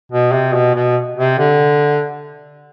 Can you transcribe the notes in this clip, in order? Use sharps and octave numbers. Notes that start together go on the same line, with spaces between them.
B2
C3
B2
B2
C3
D3